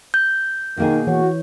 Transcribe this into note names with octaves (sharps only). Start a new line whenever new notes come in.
G6
B2 D#3 A#3 G#4
E3 F#4 C#5